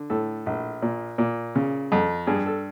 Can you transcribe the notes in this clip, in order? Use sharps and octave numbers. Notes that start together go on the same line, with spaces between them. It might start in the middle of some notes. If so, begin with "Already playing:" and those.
Already playing: D3
A2 A4
A#1
A#2
A#2
C#3
F2
G2 G#4
A4